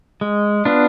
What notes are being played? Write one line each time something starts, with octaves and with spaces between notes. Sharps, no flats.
G#3
B3 D4 F4